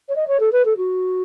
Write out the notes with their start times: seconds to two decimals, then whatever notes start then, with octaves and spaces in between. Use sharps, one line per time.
0.08 C#5
0.16 D#5
0.27 C#5
0.40 A4
0.52 B4
0.65 A4
0.77 F#4